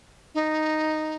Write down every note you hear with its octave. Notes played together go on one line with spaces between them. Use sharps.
D#4